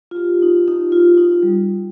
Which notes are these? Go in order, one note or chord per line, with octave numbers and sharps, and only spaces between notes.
F4
G4
D#4
D#4
F4
D#4
G3